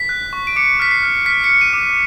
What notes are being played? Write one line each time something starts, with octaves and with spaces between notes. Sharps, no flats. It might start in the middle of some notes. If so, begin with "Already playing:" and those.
Already playing: B6
F#6
C#6
D7
D6 C#7
F6 B6
C7
F6
F6 B6
C#7
F6
D#7
D6